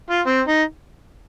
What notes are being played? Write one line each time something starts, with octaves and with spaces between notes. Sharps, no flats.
F4
C4
D#4